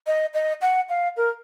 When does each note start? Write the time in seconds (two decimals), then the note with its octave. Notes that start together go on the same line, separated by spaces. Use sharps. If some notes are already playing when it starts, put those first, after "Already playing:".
0.06 D#5
0.34 D#5
0.61 F#5
0.89 F5
1.16 A#4